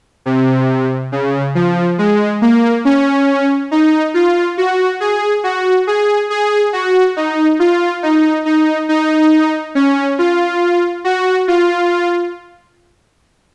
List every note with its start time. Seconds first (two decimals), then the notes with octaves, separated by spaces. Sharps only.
0.26 C3
1.12 C#3
1.55 F3
1.98 G#3
2.42 A#3
2.85 C#4
3.71 D#4
4.14 F4
4.58 F#4
5.00 G#4
5.44 F#4
5.87 G#4
6.30 G#4
6.73 F#4
7.17 D#4
7.60 F4
8.03 D#4
8.46 D#4
8.89 D#4
9.75 C#4
10.19 F4
11.04 F#4
11.48 F4